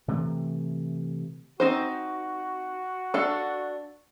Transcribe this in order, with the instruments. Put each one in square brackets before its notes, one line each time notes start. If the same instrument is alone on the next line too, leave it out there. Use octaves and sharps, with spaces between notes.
[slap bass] C3 E3 A3
[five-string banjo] C4 D#4 C5 [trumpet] F#4
[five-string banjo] D4 A4 F5